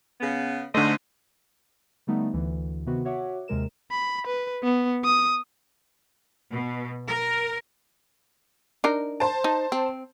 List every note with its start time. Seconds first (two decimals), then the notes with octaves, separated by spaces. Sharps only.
0.20 C#3 B3
0.75 G#2 D3 A3 C5 D#5
2.07 D3 G3 A3 B3 D#4
2.33 D2 D3 E3
2.86 C3 D#3 B3 F#4
3.05 F#4 C#5 E5 F#5 D6
3.48 D#2 C3 G#3 A#4 E7
3.91 B5
4.27 B4
4.63 B3
5.04 D#6
6.52 B2
7.07 A#4
8.84 D4 D#4 A#4
9.20 C5 A5
9.44 D#4
9.72 C4